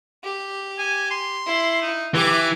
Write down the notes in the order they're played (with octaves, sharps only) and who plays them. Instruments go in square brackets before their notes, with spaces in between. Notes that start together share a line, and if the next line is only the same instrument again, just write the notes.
[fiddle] G4
[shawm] G#5
C6
[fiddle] E4
[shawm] D#4
[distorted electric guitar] E3 [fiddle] G4 D6 [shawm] G#5